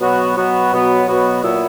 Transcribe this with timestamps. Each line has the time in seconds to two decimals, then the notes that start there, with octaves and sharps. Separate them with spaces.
0.01 B2 F#3 B3 F#4
0.36 B2 F#3 B3 F#4
0.72 B2 F#3 B3 F#4
1.08 B2 F#3 B3 F#4
1.43 A#2 F#3 B3 E4